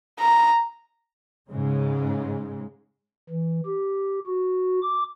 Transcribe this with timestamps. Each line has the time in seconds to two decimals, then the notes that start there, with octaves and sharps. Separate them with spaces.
0.19 A#5
1.51 G#2 C#3 G#3
3.29 E3
3.66 G4
4.27 F#4
4.82 D6